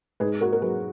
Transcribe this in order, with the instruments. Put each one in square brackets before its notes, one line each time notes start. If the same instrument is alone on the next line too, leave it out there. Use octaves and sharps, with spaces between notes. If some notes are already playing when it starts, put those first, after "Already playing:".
[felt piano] G#2 G#4 B4
F#4 A#4
A#4
F#3 G#4 B4